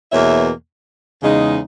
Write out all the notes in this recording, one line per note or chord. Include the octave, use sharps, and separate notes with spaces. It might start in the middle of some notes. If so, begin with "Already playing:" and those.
E2 B2 A#3 C#5 E5
E2 C#3 G#3 D#4